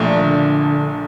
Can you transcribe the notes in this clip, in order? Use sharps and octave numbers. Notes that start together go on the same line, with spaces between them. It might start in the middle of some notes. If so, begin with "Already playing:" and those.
Already playing: A#1 A#2 A3 D4
D3